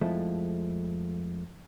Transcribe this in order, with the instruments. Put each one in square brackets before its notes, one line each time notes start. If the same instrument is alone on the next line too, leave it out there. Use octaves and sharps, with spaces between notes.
[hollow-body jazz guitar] F2 F3 G#3 A3 E4